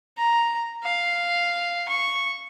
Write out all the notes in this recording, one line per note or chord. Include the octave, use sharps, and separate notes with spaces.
A#5
F5
C#6